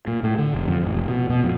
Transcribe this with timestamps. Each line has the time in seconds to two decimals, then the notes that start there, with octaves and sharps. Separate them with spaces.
0.07 A#2
0.23 A2
0.38 D3
0.54 F1
0.68 F2
0.82 A1
0.95 F1
1.08 B2
1.30 B2
1.44 F2